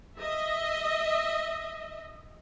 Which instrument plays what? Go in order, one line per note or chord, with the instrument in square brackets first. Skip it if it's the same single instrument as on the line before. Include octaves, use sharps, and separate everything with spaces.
[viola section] D#5 E5